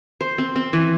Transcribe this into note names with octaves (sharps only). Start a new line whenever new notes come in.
C5
C4
C4
E3